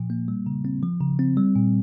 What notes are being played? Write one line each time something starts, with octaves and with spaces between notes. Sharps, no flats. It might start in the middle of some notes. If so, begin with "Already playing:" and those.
Already playing: A#2 F3
A#3
G3
C#3
C4
F3
C#3
C4
G3
A#2